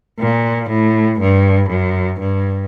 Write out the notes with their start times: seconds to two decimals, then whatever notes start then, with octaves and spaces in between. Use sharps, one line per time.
0.19 A#2
0.70 A2
1.20 G2
1.70 F#2
2.20 G2